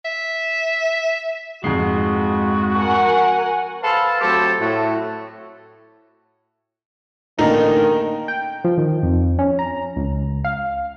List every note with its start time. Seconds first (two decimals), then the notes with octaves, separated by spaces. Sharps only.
0.05 E5
1.64 F2 G#2 G#3 F#4 C7
2.79 A#4 F#5 G#5
3.82 A4 B4 C5 F5 A5
4.21 F#3 A3 C4 G4 A4 C5
4.59 A2 A3 F#4
7.39 A1 D3 D#3 A#3 D#4
8.28 G5
8.64 F3
8.78 D#3
9.03 F2
9.39 C#4
9.59 A#5
9.96 C#2
10.44 F5